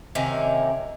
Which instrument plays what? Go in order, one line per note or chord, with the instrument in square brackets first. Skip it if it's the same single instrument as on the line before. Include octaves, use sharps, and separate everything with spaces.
[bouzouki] C3 D#3 A#3 C#4